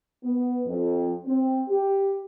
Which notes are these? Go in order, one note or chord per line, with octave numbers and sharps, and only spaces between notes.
B3
F2
C4
G4